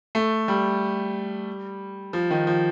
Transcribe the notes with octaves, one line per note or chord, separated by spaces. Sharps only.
A3
G3
F3
D#3
F3